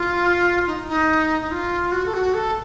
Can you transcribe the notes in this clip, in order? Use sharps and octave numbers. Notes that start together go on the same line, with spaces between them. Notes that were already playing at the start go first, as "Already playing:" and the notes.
Already playing: F4
D#4
D#4
D#4
F4
F#4
A4
F#4
A4